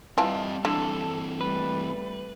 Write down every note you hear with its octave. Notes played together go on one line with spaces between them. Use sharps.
E3 G3 C4 F4 D#5 A5
D3 E3 C4 A4
G3 A3 B4